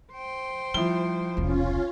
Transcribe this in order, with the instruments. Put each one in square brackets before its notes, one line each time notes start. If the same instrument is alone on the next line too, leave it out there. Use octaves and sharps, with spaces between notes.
[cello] C5 G5
[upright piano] F3 E4 G7 [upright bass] G3
[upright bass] E1 C2 [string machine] C#4 F4